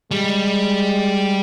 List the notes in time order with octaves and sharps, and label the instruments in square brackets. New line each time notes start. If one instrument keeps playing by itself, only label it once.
[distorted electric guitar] G3 [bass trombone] G#3